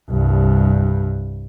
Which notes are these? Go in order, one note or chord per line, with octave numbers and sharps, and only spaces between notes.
C2 G2